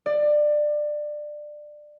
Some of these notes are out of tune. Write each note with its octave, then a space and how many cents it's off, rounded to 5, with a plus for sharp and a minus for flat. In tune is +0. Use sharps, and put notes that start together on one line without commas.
D5 +20